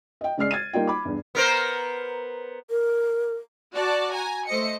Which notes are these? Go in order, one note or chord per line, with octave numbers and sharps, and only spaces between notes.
D#5 G5
C#3 G#3 D5 F6 C7
G#6 A6 D#7
G3 A#3 D#4 F4 G5
B5 D6
E2 G2
B3 A#4 C5
A#4
F#4 D5 A5
G#5 A#5
A3 C5 D#5 C#7